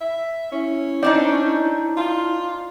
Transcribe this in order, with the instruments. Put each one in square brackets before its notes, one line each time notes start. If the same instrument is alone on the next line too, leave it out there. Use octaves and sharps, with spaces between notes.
[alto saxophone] E5
[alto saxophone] C#4 [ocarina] E4
[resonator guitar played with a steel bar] C4 D4 D#4 [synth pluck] D5
[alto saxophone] F4